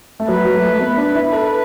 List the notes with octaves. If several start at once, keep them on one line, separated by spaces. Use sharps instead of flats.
A3
F#3 B4
F#3
A3
A3
B3
D4
E4
A4 B4